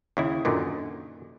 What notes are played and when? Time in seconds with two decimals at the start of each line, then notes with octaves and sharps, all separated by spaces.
0.17 D#2 C#3 E4
0.45 F#2 A#2 D3 D#3